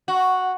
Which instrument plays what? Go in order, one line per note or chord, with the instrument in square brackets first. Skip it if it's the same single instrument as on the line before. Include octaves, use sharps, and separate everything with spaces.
[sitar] F#4